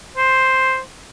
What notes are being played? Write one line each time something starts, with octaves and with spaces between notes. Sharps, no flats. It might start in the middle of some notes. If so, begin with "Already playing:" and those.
C5